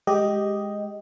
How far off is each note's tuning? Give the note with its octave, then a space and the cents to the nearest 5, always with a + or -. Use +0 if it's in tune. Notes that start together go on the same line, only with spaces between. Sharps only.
G#3 +0 G4 +0 D#5 +0